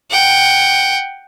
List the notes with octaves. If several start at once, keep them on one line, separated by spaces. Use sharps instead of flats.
F#5 G5